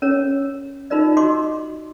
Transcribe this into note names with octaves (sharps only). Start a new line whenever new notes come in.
C#4 A#4 C#5
D#4 F4 A#4 D5 D#5
F#4 D#5 C6 D6